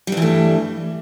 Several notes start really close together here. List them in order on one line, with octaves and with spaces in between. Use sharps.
G3 G2 E3 A3